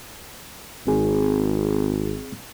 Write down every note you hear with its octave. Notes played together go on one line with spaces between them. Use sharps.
G#1 C4 G#4